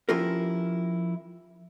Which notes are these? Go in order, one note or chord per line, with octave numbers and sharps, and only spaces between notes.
F3 C#4 E4 F4 G4 A#4